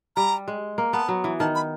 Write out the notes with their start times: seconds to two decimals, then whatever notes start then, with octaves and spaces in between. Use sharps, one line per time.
0.16 G3 A#5
0.48 G#3
0.78 A#3
0.93 B3 A5
1.08 F#3
1.24 E3
1.40 D#3 A5
1.55 B5